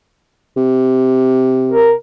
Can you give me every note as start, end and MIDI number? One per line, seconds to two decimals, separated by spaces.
0.56 1.93 48
1.72 1.93 70